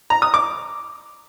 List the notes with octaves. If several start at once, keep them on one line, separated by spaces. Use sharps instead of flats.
A#5
D#6
D6